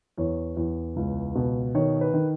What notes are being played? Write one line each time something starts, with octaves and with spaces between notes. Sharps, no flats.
E2 C#5
E2
C#2
B2
D#3 C#5
B4
D#3